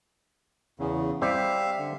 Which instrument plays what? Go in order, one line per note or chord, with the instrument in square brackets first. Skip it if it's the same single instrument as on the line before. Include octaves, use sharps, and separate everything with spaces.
[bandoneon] E2 C#3
[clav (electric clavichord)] G3 C4 G4 [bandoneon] E5 F5
[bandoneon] D3